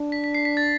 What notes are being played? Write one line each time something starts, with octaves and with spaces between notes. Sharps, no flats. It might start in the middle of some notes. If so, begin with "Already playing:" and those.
Already playing: D4
B6
B6
C7
B6
A6